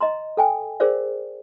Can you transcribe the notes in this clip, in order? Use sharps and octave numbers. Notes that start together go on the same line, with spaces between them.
D#5 A#5 C6
A4 G5 G#5
G#4 A#4 C5 D5 F5